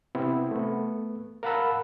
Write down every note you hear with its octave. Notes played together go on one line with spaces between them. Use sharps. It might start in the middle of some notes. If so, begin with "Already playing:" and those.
C3 B3 C4 E4
A3 B3
A#4 F5 F#5 A5 B5 E6